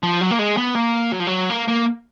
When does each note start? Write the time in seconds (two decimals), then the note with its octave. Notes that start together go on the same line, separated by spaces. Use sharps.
0.03 F3
0.21 F#3
0.31 A#3
0.39 G#3
0.58 B3
0.75 A#3
1.12 F#3
1.20 F3
1.27 F#3
1.50 A#3
1.68 A#3